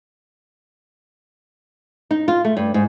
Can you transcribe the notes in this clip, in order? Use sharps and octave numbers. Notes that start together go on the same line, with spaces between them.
D#4
F4
A3
G2
G#2